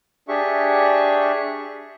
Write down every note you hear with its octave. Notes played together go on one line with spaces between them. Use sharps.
D4 G4 G#4 E5 C#6